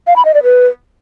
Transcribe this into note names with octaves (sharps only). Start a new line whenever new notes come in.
F5
B5
D#5
D5
B4